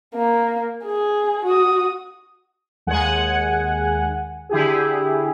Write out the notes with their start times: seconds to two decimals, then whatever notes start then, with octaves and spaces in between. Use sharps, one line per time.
0.15 A#3
0.84 G#4
1.45 F#4 D#6
2.87 D#2 G#3 F#5 G#5
4.49 D3 E4 G4 G#4